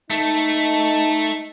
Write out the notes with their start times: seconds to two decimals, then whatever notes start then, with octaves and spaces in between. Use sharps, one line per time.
0.10 A3 D#4